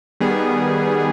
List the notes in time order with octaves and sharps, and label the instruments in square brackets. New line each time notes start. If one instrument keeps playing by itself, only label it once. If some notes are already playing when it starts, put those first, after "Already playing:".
[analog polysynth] D#3 G3 B3 G#4